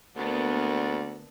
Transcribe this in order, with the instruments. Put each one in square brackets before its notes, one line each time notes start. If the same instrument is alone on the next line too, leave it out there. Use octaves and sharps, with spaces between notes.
[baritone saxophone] D2 [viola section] A#3 B3 D4